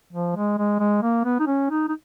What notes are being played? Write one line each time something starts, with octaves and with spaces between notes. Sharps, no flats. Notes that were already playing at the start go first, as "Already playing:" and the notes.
F3
G#3
G#3
G#3
A#3
B3
D#4
C#4
D#4
D#4